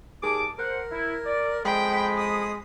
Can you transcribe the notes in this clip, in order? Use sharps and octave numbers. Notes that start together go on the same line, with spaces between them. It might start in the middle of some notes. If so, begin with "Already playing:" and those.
D#2 G#4 A5 D6
A#4 C5 F#5
E4
D5
F2 F3 G#3 G5 B5
D#6